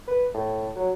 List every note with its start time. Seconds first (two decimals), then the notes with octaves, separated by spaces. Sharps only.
0.08 B4
0.34 A2
0.76 F#3